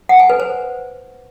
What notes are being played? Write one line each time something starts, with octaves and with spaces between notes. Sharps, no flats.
F#5
G#5
B4
C5